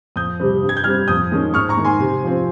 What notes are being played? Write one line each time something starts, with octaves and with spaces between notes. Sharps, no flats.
F2 D#6 G6
C3 G3 C4
G2
G#6
G6
G3 C4 F6 G#6
F2 D#6 G6
D#3 G#3 C#4
G#2 C#6 F6
A#5 C#6
D#3 G#3
G#5 C6
C3
F3 C4